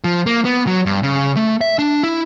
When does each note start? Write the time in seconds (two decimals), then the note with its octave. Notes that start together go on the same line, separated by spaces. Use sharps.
0.04 F3
0.26 A#3
0.45 B3
0.67 F#3
0.86 G2
1.03 C#3
1.36 A3
1.61 E5
1.79 D4
2.03 E4